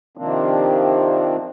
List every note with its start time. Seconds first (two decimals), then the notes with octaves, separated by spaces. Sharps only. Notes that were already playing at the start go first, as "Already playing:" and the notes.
0.17 C3 D#3 F3 A#3 C4 D4